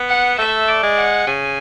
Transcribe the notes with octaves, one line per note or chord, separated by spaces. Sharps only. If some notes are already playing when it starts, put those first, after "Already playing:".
Already playing: B3
F#5
A3 E5
D5
G#3
F#5
C#3 G#5